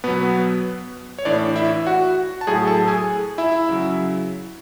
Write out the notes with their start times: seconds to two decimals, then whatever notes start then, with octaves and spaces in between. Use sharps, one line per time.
0.04 B2 F#3 B3 B4
1.18 C#5
1.25 A2 E3 D4 D5
1.56 E4 E5
1.87 F#4 F#5
2.41 A5
2.47 A2 F#3 G#4 G#5
2.67 A4 A5
2.88 G#4 G#5
3.38 E4 E5
3.69 C#3 F#3